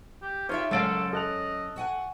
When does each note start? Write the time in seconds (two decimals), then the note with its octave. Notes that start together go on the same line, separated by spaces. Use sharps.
0.22 G4
0.49 D#4 F4 G4 C#5 E5
0.71 F#1 F#2 G#3 C#4 A4 F5 A6 D7
1.13 A4 D#5 F#6 F7
1.76 F#4 F#5 G#5